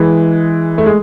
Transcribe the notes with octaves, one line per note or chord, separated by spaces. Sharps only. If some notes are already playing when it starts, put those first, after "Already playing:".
Already playing: E3 G#3
A3
G#3